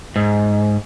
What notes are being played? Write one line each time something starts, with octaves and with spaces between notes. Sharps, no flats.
G#2